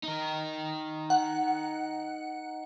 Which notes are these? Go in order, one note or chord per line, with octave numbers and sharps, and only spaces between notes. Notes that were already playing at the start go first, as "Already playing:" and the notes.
D#4 A#4
F#5